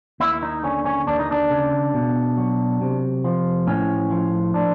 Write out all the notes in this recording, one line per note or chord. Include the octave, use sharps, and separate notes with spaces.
D#2 E4
D#4
D3 C#4
C#4
D#2 D4
D#4
D4
C#3
B2
F#3
C3
F3
A2 C#4
F3
D4